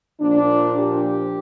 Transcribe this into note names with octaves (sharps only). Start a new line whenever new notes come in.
A#2 F3 D4
G4